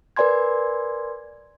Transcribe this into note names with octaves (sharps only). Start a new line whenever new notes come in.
A#4 B4 D5 G#5 C6 G#6